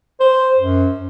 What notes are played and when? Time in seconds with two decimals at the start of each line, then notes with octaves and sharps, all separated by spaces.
0.20 C5
0.58 F#2